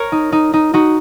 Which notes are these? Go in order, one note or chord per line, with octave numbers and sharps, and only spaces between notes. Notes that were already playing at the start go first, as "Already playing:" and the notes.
Already playing: A#4 C#5
D#4
D#4
D#4
D#4 F#4